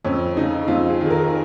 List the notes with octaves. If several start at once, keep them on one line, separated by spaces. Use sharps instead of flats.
F2 C#4
C#3 D#4
F2 F4
G#4
D#3 G#4
A#4